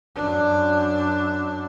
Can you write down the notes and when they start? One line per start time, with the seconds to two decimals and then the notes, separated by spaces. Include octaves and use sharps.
0.15 F#2 D4